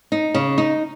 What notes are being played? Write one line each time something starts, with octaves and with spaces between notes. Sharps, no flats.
D#4
C#3
D#4